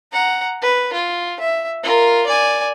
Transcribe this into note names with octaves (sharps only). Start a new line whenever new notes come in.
F#5 A#5
B4
F4
E5
F4 A#4
D5 G#5